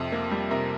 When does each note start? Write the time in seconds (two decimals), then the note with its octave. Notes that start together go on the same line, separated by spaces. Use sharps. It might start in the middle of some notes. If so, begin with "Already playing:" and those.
Already playing: F2 C3
0.12 A#3
0.31 G3
0.51 C3 A#4